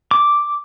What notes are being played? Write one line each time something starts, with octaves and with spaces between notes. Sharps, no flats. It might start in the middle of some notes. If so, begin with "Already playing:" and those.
D6